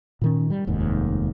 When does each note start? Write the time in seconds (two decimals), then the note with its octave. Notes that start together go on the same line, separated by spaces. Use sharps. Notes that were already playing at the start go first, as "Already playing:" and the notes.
0.21 A#2 D#3 C#4
0.50 G3
0.67 F1 D#2 G#2